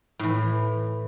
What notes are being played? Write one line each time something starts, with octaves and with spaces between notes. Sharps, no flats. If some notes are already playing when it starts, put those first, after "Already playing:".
A2 E3